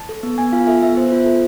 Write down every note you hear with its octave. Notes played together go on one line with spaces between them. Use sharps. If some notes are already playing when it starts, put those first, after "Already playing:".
Already playing: A5
A4
B3
B3 G#5
F4 F5
A4 E5
B3 E5
B3 C5
F4
A4